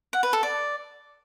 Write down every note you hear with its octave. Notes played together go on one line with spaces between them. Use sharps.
F#5
B4
A4
D5